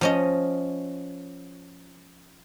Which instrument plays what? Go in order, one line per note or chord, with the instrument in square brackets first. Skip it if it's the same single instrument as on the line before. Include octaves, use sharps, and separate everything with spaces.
[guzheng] F3 C#4 D#5